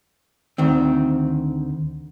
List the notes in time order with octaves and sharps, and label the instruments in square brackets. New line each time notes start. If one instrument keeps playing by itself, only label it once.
[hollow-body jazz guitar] D2 D#3 C4